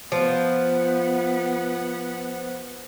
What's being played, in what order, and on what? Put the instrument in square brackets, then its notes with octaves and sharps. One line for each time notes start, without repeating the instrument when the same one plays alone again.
[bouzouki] F3 [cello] B3 F#5